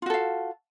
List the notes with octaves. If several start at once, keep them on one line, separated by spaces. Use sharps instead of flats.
F4 F#4 A4 F5